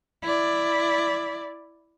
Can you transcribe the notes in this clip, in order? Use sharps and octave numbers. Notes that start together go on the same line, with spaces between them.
E4 D5